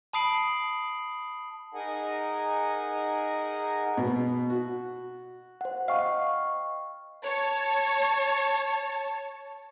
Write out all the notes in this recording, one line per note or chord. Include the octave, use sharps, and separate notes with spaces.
A5 B5 D#6 C7 D7 F#7
D#4 G#4 A#4 D#5 F#5 G#5
B2
F#4
C5 F#5
D#5 F5 G5 C#6
C#5 A5